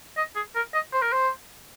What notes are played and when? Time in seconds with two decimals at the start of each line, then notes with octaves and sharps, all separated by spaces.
0.17 D#5
0.36 G#4
0.56 A#4
0.74 D#5
0.93 C5
1.02 A#4
1.12 C5